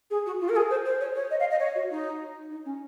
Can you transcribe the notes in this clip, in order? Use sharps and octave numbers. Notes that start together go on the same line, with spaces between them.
G#4
F#4
F4
A#4
G#4
C5
C5
C#5
C#5
D#5
F5
D#5
C#5
F#4
D#4
D#4
C#4